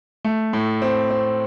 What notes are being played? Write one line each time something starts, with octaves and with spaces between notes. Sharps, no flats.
A3
A2
C4
C4